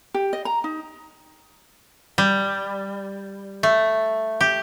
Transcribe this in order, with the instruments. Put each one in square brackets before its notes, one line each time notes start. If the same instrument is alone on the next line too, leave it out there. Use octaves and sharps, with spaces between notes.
[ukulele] G4
D#5
A#5
D#4
[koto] G3
A3
G4